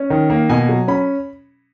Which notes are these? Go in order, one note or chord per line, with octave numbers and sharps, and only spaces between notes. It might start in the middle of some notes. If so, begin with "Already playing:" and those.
Already playing: C#4
D#3
A#3
B2 G#5
F#3
C#4 B5